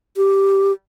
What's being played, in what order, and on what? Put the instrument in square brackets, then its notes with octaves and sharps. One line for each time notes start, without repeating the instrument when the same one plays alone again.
[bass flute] G4